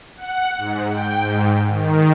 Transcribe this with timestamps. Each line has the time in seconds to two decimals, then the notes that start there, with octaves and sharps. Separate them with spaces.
0.17 F#5
0.58 G#2
0.89 G5
1.20 G#2
1.67 D#3